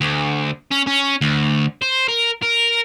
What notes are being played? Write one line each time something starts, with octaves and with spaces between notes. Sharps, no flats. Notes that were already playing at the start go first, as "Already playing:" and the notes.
D2
C#4
C#4
D2
C5
A#4
A#4